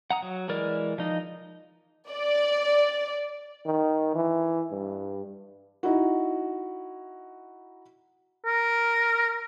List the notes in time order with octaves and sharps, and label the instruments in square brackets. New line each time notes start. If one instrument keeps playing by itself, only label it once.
[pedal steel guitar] F#5 A#5 D#6
F#3
E3 G#3 A#4 D5
F3 D#4 D#5
[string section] D5
[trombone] D#3
E3
G2
[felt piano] D#4 E4 F#4
[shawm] A#4